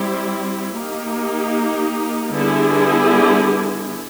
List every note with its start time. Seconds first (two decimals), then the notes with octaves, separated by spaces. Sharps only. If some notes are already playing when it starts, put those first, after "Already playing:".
Already playing: G3 C4 E4
0.75 A#3 D#4 G4
2.33 D3 G3 B3 E4 G#4